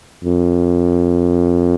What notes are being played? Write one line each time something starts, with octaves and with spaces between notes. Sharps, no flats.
F2